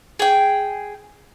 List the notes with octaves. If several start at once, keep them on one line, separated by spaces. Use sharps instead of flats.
G#4 G5